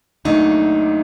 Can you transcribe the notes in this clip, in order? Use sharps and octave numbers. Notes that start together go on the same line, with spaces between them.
C2 A#2 F#3 A3 D4 D#4